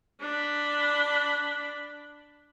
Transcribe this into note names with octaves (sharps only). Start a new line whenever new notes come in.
D4 B5